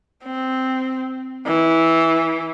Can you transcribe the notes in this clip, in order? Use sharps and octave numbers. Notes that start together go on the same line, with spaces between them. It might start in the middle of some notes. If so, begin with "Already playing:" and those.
C4
E3